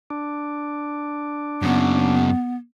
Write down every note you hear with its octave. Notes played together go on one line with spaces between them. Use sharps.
D4
F#2 C#3 B3